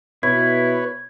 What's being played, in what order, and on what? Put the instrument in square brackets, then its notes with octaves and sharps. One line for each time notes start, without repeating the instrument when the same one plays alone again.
[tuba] B2 [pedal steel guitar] E4 [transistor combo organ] B4 C#5 [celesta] G#6